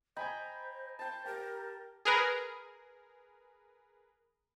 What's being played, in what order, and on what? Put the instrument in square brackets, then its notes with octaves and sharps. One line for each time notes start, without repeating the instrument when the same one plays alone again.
[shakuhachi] C5 [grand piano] D#5 G#5 G#6 [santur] G5 A#5 B5
[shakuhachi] C5 [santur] G5 A5
[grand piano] G4 [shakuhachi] A#4
[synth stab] G#4 A#4 B4